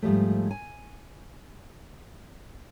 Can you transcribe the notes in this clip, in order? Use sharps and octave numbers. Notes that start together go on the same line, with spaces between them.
G#2 F3 G3 A3
G#5